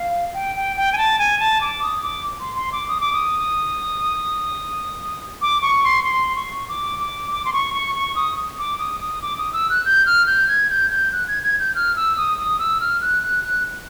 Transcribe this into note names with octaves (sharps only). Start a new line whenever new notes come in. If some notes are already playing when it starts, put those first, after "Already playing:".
Already playing: F5
G5
G5
G5
G#5
A5
G#5
A5
D6
D#6
D6
C6
C6
D6
D#6
D6
D#6
D6
C#6
C6
C6
C#6
D6
D6
D6
C6
C#6
C#6
C#6
D#6
D6
D#6
D#6
D6
D#6
E6
F#6
G6
F6
G6
G#6
G6
G6
F#6
G#6
G#6
G6
F6
E6
D#6
D#6
E6
F6
F#6
F#6
F#6